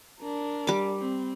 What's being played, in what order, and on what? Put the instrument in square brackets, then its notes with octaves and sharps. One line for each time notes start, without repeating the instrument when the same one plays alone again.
[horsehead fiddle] D4 A#4
[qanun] G3 D6
[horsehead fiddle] C4